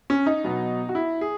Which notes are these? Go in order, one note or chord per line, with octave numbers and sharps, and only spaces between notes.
C#4
D#4
B2 F#3 B3
F#4
E4
G#4